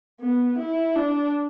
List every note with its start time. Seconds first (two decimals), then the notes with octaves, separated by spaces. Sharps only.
0.21 B3
0.58 E4
0.96 D4